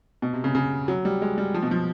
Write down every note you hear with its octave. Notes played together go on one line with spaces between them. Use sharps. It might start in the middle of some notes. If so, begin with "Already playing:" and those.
B2
C3
C#3
C#3
F#3
G3
G#3
G3
F3
B2
F3